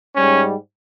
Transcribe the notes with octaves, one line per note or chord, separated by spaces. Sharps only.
G#2 G3 C#4